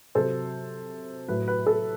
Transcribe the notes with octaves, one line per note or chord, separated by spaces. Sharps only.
C3 F#3 A4 C5
A2 F#3 B4
B4
A4